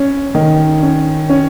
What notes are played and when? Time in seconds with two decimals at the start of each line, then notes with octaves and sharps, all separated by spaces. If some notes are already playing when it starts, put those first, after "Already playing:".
Already playing: C#4
0.35 D#3
0.82 C#4
1.30 C#4